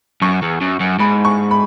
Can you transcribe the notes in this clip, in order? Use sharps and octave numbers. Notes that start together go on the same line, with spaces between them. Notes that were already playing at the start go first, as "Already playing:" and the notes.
F#2 C#6
E2
F#2
F#2
G#2 B5
C#6
B5